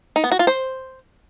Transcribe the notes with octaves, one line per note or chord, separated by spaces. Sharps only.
D#4
B3
F#4
F4
C5